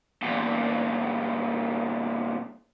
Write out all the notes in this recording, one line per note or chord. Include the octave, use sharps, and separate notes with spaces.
E2 A#2